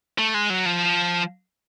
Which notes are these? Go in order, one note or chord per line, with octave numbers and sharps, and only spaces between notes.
A3
G#3
F#3
F3